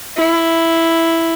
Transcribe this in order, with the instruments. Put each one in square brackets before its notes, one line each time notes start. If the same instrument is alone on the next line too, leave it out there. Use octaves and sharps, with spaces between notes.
[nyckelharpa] E4